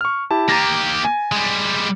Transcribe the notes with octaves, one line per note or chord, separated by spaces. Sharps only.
C#6 F6
E4 G4 A5
A#3 G4 A#5 A6 A#6
G#5
G3 G#3